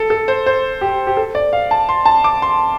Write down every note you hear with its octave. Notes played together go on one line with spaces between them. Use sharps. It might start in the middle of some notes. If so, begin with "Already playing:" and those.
Already playing: A4
A4
C5
C5
G4
G4
A4
D5
F5
A5
C6
A5
D6
C6